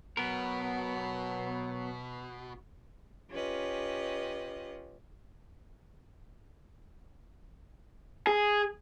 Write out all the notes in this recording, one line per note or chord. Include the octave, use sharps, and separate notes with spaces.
B2 F#3 B3 A#4
C#4 F4 G4 B4 D#5
G#4